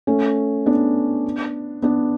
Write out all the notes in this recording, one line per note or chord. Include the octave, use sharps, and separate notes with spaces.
A3 C#4
B3 D4
B3 D4